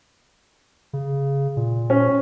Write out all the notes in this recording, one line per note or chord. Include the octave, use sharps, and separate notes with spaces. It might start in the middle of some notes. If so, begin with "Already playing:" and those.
C#3
A#2
C#4